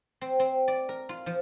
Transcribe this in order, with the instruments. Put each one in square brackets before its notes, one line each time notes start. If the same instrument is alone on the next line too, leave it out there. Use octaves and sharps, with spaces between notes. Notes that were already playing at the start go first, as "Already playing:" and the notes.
[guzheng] C4
C4
D5
A#4
F4
F3